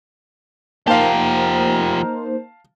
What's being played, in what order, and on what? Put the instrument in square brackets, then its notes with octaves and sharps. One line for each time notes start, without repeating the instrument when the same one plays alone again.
[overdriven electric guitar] F3 G4 [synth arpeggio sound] A#3 D#4 C5 [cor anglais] A#4 [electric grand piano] F5 A5